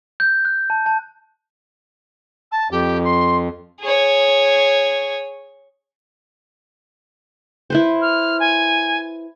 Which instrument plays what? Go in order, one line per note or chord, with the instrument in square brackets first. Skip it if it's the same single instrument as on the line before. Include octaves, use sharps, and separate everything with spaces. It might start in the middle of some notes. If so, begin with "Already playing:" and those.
[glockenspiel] G6
F#6
A5
A5
[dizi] A5
[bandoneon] F2 [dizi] G4
[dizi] C6
[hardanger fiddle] G#4 C#5
[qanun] E4 B4 C5
[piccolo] F6
G#5